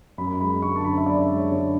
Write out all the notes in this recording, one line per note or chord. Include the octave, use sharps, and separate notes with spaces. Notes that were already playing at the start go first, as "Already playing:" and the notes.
F#2 B5
G#3 B5
D3 C#6
A5
F#2 B5
E5
F#2 D5
G#3
C#5
D3